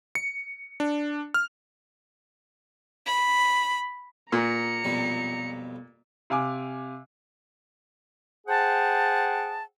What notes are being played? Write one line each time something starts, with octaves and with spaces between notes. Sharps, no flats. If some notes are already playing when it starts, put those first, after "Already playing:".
C#7
D4
F6
B5
A#2 A#5 C#7
B1 F2 G3
C3 F5 G#5 D6
G#4 C5 F#5 G5 A5